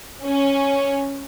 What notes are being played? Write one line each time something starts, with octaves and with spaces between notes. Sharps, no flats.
C#4